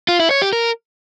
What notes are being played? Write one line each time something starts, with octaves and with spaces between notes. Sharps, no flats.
F4
E4
C#5
G4
A#4